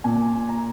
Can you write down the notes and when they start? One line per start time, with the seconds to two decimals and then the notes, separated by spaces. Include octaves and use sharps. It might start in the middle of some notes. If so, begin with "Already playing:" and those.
0.04 A#2 G#5
0.49 A#5